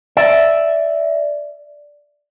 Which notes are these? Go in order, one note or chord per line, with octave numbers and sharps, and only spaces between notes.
D5 E5